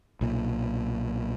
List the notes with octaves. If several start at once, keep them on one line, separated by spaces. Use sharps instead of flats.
B1 A#2